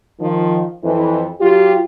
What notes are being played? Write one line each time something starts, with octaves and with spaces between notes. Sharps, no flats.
D#3 F3
F2 E3
F#3 F4 G4